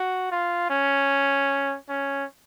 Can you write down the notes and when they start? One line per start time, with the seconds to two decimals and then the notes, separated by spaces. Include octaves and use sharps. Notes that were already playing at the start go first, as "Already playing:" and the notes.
Already playing: F#4
0.31 F4
0.70 C#4
1.89 C#4